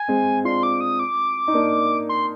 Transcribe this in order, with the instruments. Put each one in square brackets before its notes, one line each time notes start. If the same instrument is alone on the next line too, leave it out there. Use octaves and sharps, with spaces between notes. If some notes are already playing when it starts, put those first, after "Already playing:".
Already playing: [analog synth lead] G#5
[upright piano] G#3 C4
[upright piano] D4 F4 [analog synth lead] C6
[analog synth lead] D6
D#6
D6
[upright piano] D#4
A#3 D4
[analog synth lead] C6